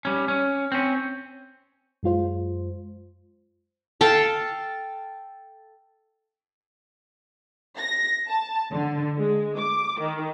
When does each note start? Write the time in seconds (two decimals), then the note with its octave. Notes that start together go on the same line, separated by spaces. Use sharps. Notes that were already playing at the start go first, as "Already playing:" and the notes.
0.05 G3 C#4
0.28 C#4
0.72 C4 C#4
2.03 F#2 G#3 F4 C5
4.01 A4 F5 G5 A5
7.78 A#6
8.28 A5
8.73 D3
9.18 G#3
9.58 D6
10.00 D#3